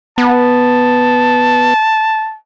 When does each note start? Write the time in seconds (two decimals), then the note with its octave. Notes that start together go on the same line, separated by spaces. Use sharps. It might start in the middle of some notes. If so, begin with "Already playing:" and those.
0.18 B3 A5